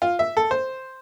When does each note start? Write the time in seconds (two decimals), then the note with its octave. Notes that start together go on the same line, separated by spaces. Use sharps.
0.02 F4
0.19 E5
0.37 A4
0.51 C5